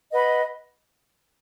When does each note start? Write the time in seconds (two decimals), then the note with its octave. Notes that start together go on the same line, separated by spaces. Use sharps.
0.12 B4 D#5 F#5 B5